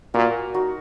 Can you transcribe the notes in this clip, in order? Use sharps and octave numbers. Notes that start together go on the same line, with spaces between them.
A#2 F#4 A#4
D#4 F#4